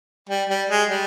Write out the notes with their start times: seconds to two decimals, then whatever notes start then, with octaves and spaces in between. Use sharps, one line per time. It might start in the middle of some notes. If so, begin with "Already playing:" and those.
0.30 G3
0.49 G3
0.70 G#3
0.89 G3